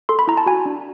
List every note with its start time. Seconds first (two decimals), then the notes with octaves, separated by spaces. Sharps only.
0.09 A4 C6
0.19 B5
0.28 E4 A#5
0.37 A5
0.46 F#4 G#5
0.66 D4